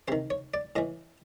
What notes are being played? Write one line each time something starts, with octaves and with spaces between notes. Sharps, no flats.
C3 D#3 C5
C#5
D5
A2 E3 D#5